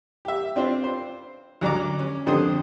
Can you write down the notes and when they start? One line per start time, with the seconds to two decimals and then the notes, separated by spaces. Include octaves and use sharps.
0.25 G4 E5
0.56 C4 D4 F4 C5
0.84 C5
1.61 D2 F#3 D5 A#5 D6
1.99 C#4
2.26 F2 D3 C5 G5 D#6